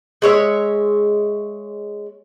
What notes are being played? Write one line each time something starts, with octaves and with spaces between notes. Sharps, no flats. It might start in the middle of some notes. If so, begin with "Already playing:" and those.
G#3 C#5 E5